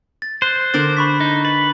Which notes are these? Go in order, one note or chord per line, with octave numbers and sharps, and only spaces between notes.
A6
C5 F#6 G7
D3 D4 A#4 A6
B5 C#6 B6
D#4
B4 A6